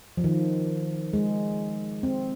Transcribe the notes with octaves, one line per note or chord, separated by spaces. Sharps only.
F3
D#3
G#3
C4